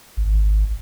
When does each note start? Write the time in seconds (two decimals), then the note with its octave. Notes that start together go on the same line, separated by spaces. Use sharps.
0.17 G#1